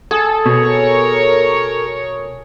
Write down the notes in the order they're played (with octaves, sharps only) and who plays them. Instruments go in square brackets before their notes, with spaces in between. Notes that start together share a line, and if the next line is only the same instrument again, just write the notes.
[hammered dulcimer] G#4 [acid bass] A4
[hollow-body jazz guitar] B2 [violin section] A#4 C#5